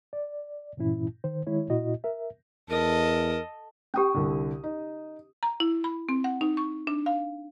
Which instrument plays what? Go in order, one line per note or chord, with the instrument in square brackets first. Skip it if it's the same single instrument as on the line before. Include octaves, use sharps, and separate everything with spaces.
[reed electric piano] D5
G2 A#2 E3 C#4 E4
D#3 C5
D#3 G#3 E4 C#5
A#2 E4 F#4 D#5
A#4 E5
[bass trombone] E2 [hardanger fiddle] A4 D#5 [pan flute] A#4
[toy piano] C#4 G4 [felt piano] G5 D#6
[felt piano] C2 D3
D#4
[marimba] A#5
E4
B5
C4
F#5
D#4
C#6
D4
F5